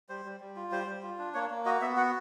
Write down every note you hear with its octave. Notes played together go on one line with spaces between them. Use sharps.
G3 C5
G3
G3
F4
G3 C5
G3
F4
D4
A#3 C#5
A#3
F#4 D#5
B3 E5
F#4 F#5